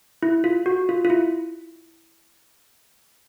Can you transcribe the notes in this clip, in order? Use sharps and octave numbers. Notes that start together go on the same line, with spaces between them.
E4
F4
F#4
F4
F4
E4